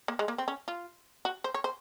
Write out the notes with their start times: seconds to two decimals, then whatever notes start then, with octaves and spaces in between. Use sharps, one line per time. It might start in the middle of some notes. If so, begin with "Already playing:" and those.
0.08 A#3
0.19 G#3
0.28 A#3
0.38 C4
0.48 C#4
0.68 F4
1.25 F#4
1.44 C5
1.54 C#5
1.64 C5